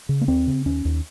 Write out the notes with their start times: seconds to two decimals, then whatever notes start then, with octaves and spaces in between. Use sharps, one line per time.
0.09 C#3
0.21 A#3
0.28 D#2 C4
0.47 C#3
0.66 D#2 C#4
0.85 D#2